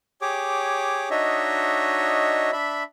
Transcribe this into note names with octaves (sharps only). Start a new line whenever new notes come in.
G4 G#4 C#5 D6
D4 D#4 F#4 C#5 D#5 E5
D4 E5 B5